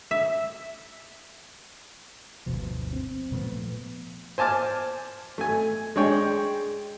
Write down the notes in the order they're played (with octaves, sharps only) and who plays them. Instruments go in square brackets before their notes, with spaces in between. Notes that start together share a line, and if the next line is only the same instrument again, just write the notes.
[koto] E5
[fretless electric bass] G1 D2 B2 F3
C4
A#2 F3 A3 B3
[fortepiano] C5 G#5 A5 D6 F6
A3 G#5
G#3 D4 G#4 C#5 G5